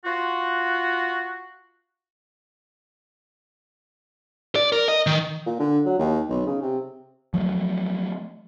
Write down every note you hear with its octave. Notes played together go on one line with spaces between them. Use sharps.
F4 F#4
D5
A#4
D#5
D#3
A#2
D3
F#3
D#2
B1
C#3
C3
F3 F#3 A3